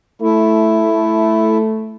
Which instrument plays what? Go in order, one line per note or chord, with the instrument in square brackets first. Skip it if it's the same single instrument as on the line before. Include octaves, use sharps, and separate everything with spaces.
[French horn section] A3 [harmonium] E4